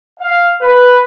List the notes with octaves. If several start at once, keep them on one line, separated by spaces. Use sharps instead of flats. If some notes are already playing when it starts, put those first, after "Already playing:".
F5
B4